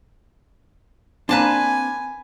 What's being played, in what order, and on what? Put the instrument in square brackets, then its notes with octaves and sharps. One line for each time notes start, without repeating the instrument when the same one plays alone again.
[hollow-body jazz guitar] A#3 C4 D4 [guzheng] B4 A5 C6 [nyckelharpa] G#5